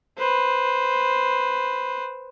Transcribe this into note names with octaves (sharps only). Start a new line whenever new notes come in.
B4 C5